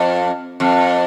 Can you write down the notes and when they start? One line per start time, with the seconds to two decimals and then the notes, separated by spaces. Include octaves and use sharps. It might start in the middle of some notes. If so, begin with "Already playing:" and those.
Already playing: F2
0.60 F2